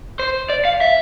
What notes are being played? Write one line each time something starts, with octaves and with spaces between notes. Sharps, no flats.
C5
D5
F5
E5